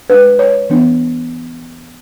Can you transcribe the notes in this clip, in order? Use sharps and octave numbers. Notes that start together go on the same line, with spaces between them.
G#3 D4 B4
C#5
E3 B3 D4